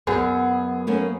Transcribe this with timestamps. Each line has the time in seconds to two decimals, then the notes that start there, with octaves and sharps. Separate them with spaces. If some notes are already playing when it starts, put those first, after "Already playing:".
0.07 F#2 B3 G#4
0.87 A3 A#3 C#4